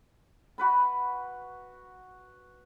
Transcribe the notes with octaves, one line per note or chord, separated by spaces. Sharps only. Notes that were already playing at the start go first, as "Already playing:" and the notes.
F#4 B4 B5